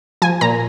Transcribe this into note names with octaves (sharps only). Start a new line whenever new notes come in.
F3 G#5
A#2 A#5